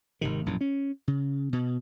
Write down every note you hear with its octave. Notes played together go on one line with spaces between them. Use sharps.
G#1 C3 D#3
A#1 F#2 A2
C#4
C#3
B2